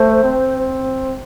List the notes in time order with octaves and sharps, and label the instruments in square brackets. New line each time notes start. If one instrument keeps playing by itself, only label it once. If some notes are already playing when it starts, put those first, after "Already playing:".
Already playing: [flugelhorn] A3 [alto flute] C5
[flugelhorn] C4